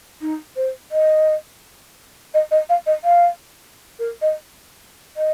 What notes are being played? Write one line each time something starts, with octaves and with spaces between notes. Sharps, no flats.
D#4
C5
D#5
D#5
D#5
F5
D#5
F5
A#4
D#5
D#5